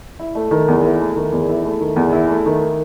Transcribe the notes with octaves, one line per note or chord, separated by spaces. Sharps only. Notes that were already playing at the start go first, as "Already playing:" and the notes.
E4
A3
D#3
E2
E4
A3
D#3
E2
E4
A3
D#3
E2
E4
A3
D#3